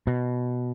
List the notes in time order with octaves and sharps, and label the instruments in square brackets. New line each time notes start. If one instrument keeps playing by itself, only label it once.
[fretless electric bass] B2